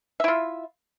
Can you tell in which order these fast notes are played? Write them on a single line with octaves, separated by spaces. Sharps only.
E5 E4 F4